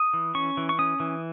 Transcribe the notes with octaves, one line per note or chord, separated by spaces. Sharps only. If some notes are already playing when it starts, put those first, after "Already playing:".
Already playing: D#6
E3
C#4 C#6
E3
C#6
C#4 D#6
E3